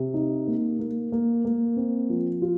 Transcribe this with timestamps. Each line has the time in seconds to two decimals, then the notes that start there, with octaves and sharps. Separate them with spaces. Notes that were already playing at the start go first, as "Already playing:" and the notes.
Already playing: C3
0.14 D#4
0.47 A#3
0.79 A#3
1.12 A#3
1.45 A#3
1.77 C4
2.10 F3
2.42 F4